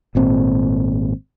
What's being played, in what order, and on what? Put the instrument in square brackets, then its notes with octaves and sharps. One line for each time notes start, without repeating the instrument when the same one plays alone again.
[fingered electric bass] G#1 A#2 C4